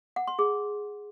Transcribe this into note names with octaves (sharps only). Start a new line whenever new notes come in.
F#5
C6
G#4